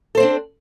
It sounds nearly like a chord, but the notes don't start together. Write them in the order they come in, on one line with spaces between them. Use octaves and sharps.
A4 C5 C4 D4